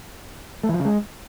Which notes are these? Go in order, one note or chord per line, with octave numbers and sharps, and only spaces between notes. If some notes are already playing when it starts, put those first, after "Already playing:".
A3
E3
F3
C#3
G#3